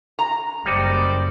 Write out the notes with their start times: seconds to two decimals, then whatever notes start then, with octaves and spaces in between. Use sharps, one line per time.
0.19 A#5
0.65 F#1 G3 D#4 F#4 G4 C5 D5